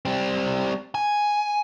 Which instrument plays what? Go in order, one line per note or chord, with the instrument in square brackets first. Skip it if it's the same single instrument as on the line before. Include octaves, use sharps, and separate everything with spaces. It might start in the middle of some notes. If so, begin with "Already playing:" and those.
[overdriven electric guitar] G3 C4
G#5